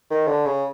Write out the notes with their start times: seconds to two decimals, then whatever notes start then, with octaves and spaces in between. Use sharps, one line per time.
0.10 D#3
0.27 D3
0.46 C#3